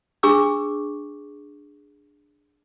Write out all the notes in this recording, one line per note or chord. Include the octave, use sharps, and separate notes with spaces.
D4 G#4 C#6 D6 E6